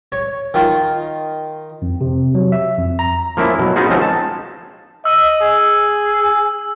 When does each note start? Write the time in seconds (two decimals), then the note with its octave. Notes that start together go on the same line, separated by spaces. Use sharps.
0.12 C#5
0.54 D#3 F4
1.82 F2
2.01 C3
2.35 F#3
2.52 E5
2.78 F2
2.99 A#5
3.37 F3 A#3 C#4 E4
3.59 B2 F#3
3.76 B3 C#4 D#4 F4 F#4 G#4
3.90 F3 G#3 C4 C#4 D#4
4.02 A5
5.05 D#5 E6
5.41 G#4